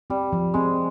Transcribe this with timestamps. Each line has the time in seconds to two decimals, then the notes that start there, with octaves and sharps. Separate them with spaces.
0.10 G3 C4
0.33 F3
0.54 G#3 C4